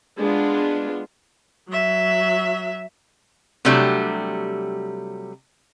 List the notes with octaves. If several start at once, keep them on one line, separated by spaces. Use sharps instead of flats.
G#3 B3 D4 F4
F#3 E5
C3 F#3 G3 A3 D4